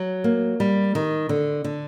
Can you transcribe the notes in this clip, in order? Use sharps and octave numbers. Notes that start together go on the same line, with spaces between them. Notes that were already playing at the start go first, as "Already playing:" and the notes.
Already playing: F#3
A#3
G3
D#3
D3
D3